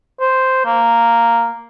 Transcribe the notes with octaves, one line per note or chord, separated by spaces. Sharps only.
C5
A#3